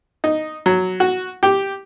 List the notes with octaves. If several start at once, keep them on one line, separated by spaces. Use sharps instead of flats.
D#4
F#3
F#4
G4